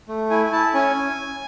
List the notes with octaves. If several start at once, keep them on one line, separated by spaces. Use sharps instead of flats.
A3
E4 G#5
G#5
E4 A5
C#4 G#5